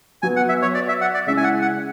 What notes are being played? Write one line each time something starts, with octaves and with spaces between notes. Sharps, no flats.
F#3 B3 F#4 G#5
F#5
E5
C#5
D5
E5
F#5
D5
C#3 G#3 C#4 E4 E5
G#5
F#5
F#5